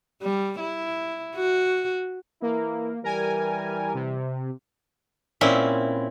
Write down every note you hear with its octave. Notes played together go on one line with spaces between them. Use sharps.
G3
E4
F#4
E3 A#3 E4 A#4
E3 G3 A#4 G#5
C3
A#2 C4 C#4 E4